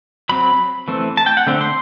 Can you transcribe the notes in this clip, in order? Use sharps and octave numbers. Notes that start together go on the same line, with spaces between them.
F#3 C4 B5
E3 A3 C4
A5
G5
F#5
D3 A3 C4
C6